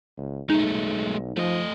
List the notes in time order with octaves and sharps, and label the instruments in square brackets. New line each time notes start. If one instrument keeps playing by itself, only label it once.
[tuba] C#2
[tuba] B1 [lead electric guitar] G#3 A3 [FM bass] D#4
[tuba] F3 [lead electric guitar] A3 D#5